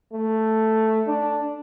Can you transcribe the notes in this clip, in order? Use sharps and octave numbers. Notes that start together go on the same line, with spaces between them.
A3
D4